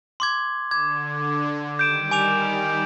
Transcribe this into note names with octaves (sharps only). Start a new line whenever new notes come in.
C6 D6 G#6
D3 D6 G#6
D#3 G3 G6 D7 E7
G#5 D6 F7